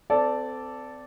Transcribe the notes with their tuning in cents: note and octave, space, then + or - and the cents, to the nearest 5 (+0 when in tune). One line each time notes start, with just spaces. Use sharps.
C4 -30 A4 +0 D5 -10